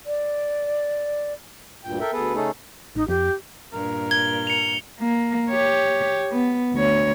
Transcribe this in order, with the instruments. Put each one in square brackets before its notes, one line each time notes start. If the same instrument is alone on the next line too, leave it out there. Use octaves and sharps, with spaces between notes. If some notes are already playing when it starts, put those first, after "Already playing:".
[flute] D5
[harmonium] D2 G2 A#2 G5
A4 A#4 E5 G5
D2 B3 G#4 A4 B4
C#3 A3 C#4 D#4 G#4 A4
[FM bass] A1 [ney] D#4
[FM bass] F2 [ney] G4
[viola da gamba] G2 A#2 [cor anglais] A#4
[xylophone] G#6 [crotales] G7
[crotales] C#7 F7
[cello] A#3
G4 C#5
B3
D2 C#5